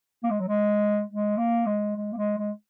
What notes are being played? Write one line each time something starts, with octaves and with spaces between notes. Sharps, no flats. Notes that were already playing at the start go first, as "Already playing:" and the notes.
A#3
G#3
F#3
G#3
G#3
A#3
G#3
G#3
A#3
G#3
G#3